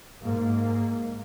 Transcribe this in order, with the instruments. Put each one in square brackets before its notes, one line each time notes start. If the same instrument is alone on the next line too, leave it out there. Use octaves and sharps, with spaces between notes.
[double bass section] G#2 A#3